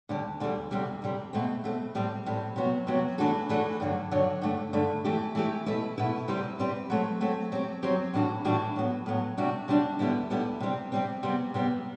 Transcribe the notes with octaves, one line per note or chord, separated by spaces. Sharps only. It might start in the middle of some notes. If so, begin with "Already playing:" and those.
D2 D3 G3
D2 D3 G3
D2 C3 G3
D2 C3 G3
B2 A3 C4
B2 A3 C4
A2 G3 C4
A2 G3 C4
C3 F#3 B3 F#4
C3 F#3 B3 F#4
E3 A3 D4 F#4 A4
E3 A3 D4 F#4 A4
G2 D3 F#3
G2 D3 F#3
G2 D3 A3
G2 D3 A3
E3 A3 E4 G4
E3 A3 E4 G4
B2 A3 E4 B4
B2 A3 E4 B4
C3 G3 C4 G4 B4
C3 G3 C4 G4 B4
F#3 A3 C4
F#3 A3 C4
F#3 C4 G4
F#3 C4 G4
A2 E3 G3 D4 F#4
A2 E3 G3 D4 F#4
A2 F#3 B3
A2 F#3 B3
C3 G3 D4 F#4
C3 G3 D4 F#4
D2 D3 G3 B3 E4
D2 D3 G3 B3 E4
C3 G3 C4
C3 G3 C4
C3 G3 B3
C3 G3 B3